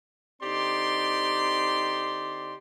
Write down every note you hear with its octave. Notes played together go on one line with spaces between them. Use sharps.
D3 C4 D#4 G4 D5 C6